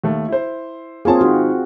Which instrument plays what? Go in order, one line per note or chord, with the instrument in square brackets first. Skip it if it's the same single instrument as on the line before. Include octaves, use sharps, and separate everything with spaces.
[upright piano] D#2 A3
E4 C5
[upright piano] A#3 C#5 A5 [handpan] C4 F4 G#4
[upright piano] G#2 D#3 [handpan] F#4